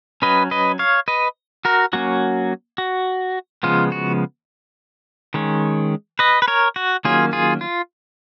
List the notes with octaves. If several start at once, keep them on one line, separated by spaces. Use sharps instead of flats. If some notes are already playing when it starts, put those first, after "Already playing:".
F#3 C#4 B4 D#5
B4 D#5
C#5 F5
B4 D#5
F#4 A#4
F#3 A#3 C#4 F#4
F#4
C#3 F3 G#3 B3 F4
F#4
D#3 G#3 C#4
B4 D#5
B4
A#4 C#5
F#4
D#3 F#3 A#3 C#4 F4 G#4
F4 G#4
F4